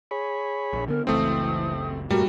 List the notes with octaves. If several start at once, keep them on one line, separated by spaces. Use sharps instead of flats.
G#4 C#5 B5
A#1
D3 B3 A#4
F#1 C#2 E3 A3 C4 D#6
F1 G2 A#2 G3 A3 F#4 A#4